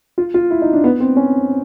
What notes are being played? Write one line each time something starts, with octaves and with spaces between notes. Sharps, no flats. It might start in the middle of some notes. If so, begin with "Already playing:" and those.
F4
F4
E4
D#4
D4
B3
C4
C#4